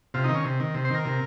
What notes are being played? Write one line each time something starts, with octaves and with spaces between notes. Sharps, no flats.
C3 F4
D#3 D#4
C#4
C3
D#3
C3
C5
D#3 A#4
C3